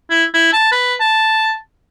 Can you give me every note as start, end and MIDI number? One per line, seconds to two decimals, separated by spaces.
0.10 0.24 64
0.34 0.50 64
0.53 0.68 81
0.72 0.95 71
1.00 1.55 81